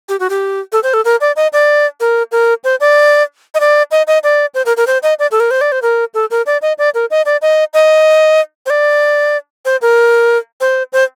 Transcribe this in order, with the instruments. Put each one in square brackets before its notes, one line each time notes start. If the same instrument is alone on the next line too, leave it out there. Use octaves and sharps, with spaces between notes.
[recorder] G4
F#4
G4
A4
C5
A4
A#4
D5
D#5
D5
A#4
A#4
C5
D5
D#5
D5
D#5
D#5
D5
C5
A#4
A#4
C5
D#5
D5
A4
A#4
C5
D5
C5
A#4
A4
A#4
D5
D#5
D5
A#4
D#5
D5
D#5
D#5
C5
D5
C5
A#4
C5
C5